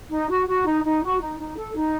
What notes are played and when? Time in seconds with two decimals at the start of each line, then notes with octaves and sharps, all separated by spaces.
0.09 D#4
0.28 F#4
0.46 F#4
0.65 D#4
0.83 D#4
1.01 F#4
1.20 D#4
1.38 D#4
1.56 A4
1.74 D#4